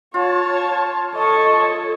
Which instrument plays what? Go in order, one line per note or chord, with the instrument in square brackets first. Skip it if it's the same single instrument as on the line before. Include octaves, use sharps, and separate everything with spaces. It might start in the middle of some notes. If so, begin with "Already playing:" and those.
[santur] F4 [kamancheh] C#5 A5
[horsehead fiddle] A4 C#5 [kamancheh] D#5 A5 [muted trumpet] C#6